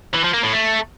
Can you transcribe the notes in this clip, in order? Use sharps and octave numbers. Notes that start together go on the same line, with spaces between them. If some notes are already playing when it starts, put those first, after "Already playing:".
E3
F3
A#3
A2
A3